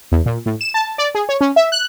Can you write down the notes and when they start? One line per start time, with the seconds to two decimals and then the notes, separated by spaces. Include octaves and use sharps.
0.12 E2
0.26 A#2
0.46 A2
0.61 E7
0.74 A5
0.98 D5
1.15 G#4
1.29 C#5
1.41 C#4
1.56 E5
1.72 F#6